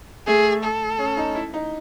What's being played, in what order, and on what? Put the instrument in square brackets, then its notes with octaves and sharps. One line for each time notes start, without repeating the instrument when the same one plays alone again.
[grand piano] A3 [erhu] G#4
[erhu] A4
[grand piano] C#4
D#4
E4
D#4